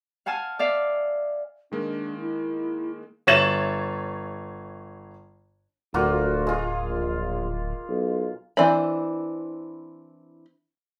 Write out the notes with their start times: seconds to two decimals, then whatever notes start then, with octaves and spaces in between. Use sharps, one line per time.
0.26 F5 F#5 G#5 A5 F6
0.59 D5 E5 F5
1.72 D#3 G#3 A#3 D4
2.20 E4
3.27 G1 C#5 E5 A6 E7 F#7
5.94 D1 D2 A#3 F4 F#4
6.47 G#3 F4
6.85 A#1
7.88 B1
8.57 E3 C4 D4 C5 B5